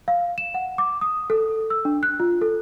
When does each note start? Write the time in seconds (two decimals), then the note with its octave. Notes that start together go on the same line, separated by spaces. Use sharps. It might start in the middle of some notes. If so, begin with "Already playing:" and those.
0.08 F5
0.38 E7
0.54 F#5
0.78 D6
1.01 D#6
1.30 A4
1.70 E6
1.85 D4
2.03 F#6
2.20 F4
2.41 A4